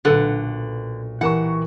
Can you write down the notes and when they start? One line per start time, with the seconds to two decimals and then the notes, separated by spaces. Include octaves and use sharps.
0.05 B1 A#2 D3 A4 B4 F#5
1.21 E3 G4 A#4 F#5 C#6 E7